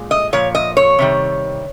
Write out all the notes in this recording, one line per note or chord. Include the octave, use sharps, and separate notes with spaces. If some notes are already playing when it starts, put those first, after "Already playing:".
Already playing: A#2 G#3
D#5
A#2 F3 C#5
D#5
C#5
C3 D#3 G3